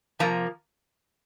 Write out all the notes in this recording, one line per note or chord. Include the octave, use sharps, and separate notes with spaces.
C3 F3 A#3 A#5